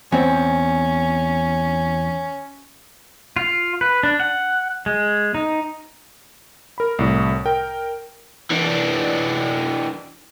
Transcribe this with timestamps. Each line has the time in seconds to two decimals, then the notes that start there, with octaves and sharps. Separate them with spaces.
0.12 E2 C4 C#4
3.36 F4
3.81 B4
4.03 D4
4.20 F#5
4.86 G#3
5.35 D#4
6.78 A#4 B5
6.99 C2 A2
7.46 A#4 G5
8.51 E3 D4